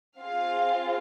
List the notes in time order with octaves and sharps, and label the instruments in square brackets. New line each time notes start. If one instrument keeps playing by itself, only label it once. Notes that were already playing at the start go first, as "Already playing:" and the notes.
[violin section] C4 F4 G#4 F5